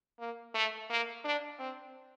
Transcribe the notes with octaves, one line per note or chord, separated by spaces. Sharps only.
A#3
A3
A#3
D4
C4